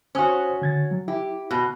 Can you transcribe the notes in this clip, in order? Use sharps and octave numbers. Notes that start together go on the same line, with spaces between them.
C#4 F#4 C5 D#6 F#6
D3 G#6 A6
F#3
E4 G4
B2